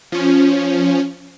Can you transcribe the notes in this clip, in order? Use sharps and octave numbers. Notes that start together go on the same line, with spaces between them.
F3 C#4